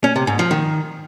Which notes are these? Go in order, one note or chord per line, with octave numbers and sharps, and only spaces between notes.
C#4
C3
G#2
F3
D#3